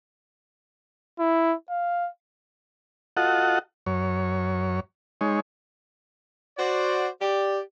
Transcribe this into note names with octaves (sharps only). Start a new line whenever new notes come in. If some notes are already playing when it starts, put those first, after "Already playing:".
E4
F5
F4 F#4 A4 D#5 F#5
F#2 C#5
G#3 D#4 C#5
F#4 C5 D5
G4 D5